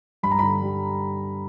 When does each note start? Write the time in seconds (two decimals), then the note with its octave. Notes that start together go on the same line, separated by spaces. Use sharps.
0.23 G2 B5
0.31 A#5
0.39 D3 B5
0.62 G3